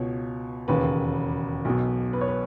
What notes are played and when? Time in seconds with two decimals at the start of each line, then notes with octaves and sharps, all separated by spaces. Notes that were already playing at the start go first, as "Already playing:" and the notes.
Already playing: C#2 B2 C#5
0.68 E1 D#2 C#3 B4
1.65 B1 B2
2.13 B4
2.21 C#5
2.28 B4